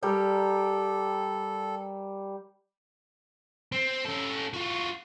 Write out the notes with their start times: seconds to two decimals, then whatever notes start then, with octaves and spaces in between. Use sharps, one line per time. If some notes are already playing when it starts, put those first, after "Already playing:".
0.03 G3 G4 A4 A#4
3.72 C4
4.05 C#4 A4
4.54 F4 F#4